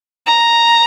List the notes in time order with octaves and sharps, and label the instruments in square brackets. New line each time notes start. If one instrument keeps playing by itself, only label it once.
[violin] A#5